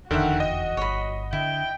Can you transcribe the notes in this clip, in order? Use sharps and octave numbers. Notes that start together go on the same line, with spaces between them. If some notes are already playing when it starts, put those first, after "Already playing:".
F1 E2 D3 D#3 F#4 E5 F#5 G5
D#5
G1 C#5 B5
D3 E4 G5